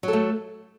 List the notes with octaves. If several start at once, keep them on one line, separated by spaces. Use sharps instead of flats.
F#3 A3 A4